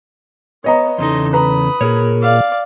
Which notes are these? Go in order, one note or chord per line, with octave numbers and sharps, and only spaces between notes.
B3 C#5 D#5 A#5
E2 C#3 D#4 A4 C6
B4 A#5 B5 D#6
A#2 G#4 A#4 C#5
D5 F5